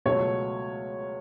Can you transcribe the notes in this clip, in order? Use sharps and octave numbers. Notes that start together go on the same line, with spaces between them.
C#2 B2 F#3 A3 C#5